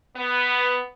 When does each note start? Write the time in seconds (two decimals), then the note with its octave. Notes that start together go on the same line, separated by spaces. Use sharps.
0.16 B3